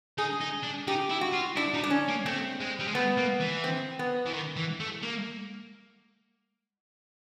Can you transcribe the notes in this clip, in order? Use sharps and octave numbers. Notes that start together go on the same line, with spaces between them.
D#4 G#4
D#4
D4
D#4 G4
E4
F#4
F4
D4 E4
D#4
D4
C#4
A#3
A3 C4
G#3
G3
G#3
A3 B3
A#3
E3
C4
B3
E3
D#3
E3
A3
A#3